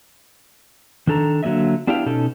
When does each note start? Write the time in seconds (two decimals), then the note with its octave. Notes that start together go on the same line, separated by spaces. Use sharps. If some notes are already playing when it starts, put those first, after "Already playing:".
1.07 D#3 D4 A4 A#5
1.43 D3 F#3 A#3 D#5 E5
1.87 B3 D4 E4 G4 F5 G5
2.06 B2 C#4 D#4 A4